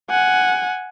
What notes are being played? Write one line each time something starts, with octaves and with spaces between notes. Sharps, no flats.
F#5 G#5